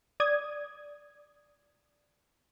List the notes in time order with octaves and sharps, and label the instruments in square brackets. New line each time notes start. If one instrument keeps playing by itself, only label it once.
[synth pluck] D5 D#6 G#6